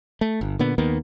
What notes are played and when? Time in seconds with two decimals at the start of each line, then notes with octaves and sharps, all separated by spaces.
0.21 A3
0.41 G1
0.59 A#2 D3 B3
0.78 D#2 D#3 A#3 B3